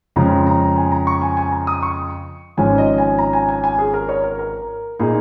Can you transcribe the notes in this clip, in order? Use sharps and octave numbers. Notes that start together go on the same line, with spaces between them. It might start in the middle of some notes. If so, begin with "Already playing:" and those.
F2 C#3 F3 G#3 A#5
A#5
G#5
A#5
C#6
G#5
G#5
A#5
D#6
C#6
G#1 G#2 F3 C#4 G#5
D#5
G#5
A#5
G#5
G#5
G#5
G#4
A#4
C#5
A#4
A#4
A#2 A#3 D#4 G#4